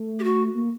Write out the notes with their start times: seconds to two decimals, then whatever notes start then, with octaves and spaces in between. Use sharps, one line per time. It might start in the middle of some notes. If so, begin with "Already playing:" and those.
Already playing: A3
0.19 G4
0.24 F#4
0.55 A#3